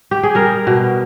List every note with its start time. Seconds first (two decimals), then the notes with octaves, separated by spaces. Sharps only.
0.11 G4
0.23 G#4
0.35 G3 A#4
0.67 B2